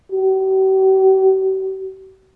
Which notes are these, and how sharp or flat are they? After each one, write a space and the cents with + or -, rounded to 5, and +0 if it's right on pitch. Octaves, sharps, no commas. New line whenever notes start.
G4 -45